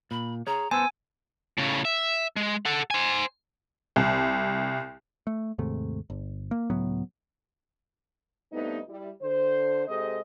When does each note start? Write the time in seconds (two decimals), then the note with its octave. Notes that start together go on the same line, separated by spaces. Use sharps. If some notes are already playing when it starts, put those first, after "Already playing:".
0.11 A#2 B5
0.47 G#4 C#5 A#5
0.71 B3 C5 G#5 A5 E6
1.58 A2 C#3
1.85 E5
2.36 G#3
2.65 A4 F#5
2.91 C5 G#5
3.96 C2
5.27 A3
5.58 D#2 G#2 C3 A3
6.10 G1
6.51 A#3
6.70 C#2 A2 F#3 B3
8.52 G2 A3 B3 C4 D#4
8.88 G3 E4
9.22 D3 C5
9.87 C3 G#3 A4 C5 D#5